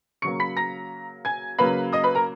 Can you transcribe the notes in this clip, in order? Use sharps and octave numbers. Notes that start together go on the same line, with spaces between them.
C#3 F#3 A#3 C#6 C#7
B5 B6
A#5 A#6
G#5 G#6
C#3 F#3 A#3 B4 B5
D#5 D#6
B4 B5
A#4 A#5